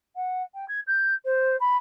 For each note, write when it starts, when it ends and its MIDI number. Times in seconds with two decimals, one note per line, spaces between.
0.16 0.43 78
0.54 0.65 79
0.68 0.80 92
0.87 1.14 91
1.25 1.56 72
1.60 1.77 83